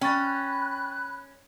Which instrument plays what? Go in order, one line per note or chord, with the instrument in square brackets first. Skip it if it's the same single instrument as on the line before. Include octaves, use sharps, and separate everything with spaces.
[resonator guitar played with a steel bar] C#4 [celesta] G5 C#6 A6 [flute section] B5 F#6